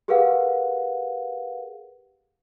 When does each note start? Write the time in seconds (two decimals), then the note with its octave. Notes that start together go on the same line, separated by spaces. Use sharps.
0.08 G4 G#4 A#4 B4 F5 F#5